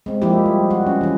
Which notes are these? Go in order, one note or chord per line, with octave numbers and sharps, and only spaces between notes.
G#3 C4
F3 G#3 A#3 E4 G4
G3
F#4
C#4
E3 C#4